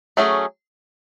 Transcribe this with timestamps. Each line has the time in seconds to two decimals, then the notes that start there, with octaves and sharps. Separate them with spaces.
0.17 F#3 A3 C#4 G#4